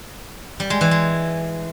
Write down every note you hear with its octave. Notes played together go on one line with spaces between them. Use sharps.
G3
G#3
E3
G#3